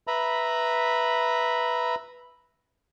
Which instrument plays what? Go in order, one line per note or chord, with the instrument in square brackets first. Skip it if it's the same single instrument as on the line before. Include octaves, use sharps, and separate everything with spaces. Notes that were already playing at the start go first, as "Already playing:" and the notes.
[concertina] B4 E5 A#5 B5